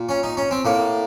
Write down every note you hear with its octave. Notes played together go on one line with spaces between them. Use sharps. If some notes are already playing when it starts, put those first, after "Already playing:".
Already playing: A#2
C#4
D#4
C#4
C4
A2 A#3